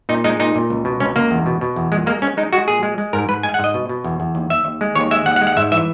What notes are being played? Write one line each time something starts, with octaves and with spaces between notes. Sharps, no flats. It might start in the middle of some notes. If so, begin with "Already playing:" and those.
A#2 D#4
G#3 D#4
A#2 D#4
A#2
C#2
B2
C#2 C#4
C#2 A#3
E2
B2
B2
E2
A#2 G#3
G#3 A#3
G#3 C#4
G#3 D#4
G#3 F#4
A#2 G#4
G#3
G#3
G#2 A#4
G#2 B4
G#3 G#5
F#5
G#2
D#5
B2
B2
E2
E2
D#2
D#2 E5
D#2
G#3
D#2 C#5
G#3 E5
D#2 F#5
F#5
G#3
F#5
G#2 E5
E3 E5